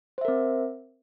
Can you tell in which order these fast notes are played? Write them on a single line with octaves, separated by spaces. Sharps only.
C5 E5 A#4 C4